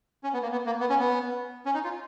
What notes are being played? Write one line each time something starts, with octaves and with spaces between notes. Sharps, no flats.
C#4
B3
A#3
B3
A#3
B3
C#4
B3
C#4
D#4
F4